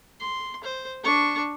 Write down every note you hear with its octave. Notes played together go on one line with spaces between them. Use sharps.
C6
C5
D4 C#6